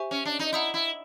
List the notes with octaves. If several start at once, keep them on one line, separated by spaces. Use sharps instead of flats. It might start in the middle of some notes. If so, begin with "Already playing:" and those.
Already playing: G4 C5 E5 G#5 C#6
C#4
D4
D#4
E4 F#5 A#5 D#6 G6
E4